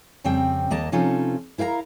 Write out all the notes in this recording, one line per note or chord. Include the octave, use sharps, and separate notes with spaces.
F2 C#3 G3 C4 G5
D#2 A#3 D#5 A5
C3 F3 C#4 D#4 F4 A4
E4 A#4 F5 G5 A#5